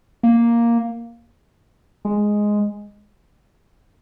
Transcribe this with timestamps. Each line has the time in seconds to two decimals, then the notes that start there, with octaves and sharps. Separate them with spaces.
0.23 A#3
2.05 G#3